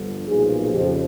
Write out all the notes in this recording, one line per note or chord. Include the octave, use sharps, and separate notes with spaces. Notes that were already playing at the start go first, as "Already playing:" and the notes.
Already playing: G1 G2 D3 F3
B1 A#2 F3 G#4
F2 C#3 F3 G4